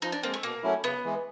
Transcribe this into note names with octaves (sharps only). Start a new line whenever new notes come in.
F3 D#4
D4
G#3 A#3 C4
A3
B2 A#3
F#3 A3 C#4 E4
C#3 B3
E3 G#3